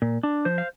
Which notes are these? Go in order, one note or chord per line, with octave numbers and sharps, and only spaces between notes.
A#2
D4
F3 C5
F5